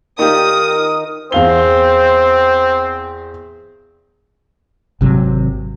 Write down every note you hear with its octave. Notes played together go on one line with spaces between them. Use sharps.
D#3 D#4 F4 G4 A#4 D#6
E2 C4 C5 F5 G7
G#1 C3 F#3